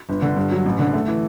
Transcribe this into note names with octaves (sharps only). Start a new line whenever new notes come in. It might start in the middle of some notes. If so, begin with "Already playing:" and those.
G1
D3
G2
F#3
A1
D3
A3
E3